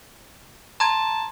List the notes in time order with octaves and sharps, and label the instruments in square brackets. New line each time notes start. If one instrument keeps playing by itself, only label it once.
[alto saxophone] A5 [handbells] A#5 C6 G#6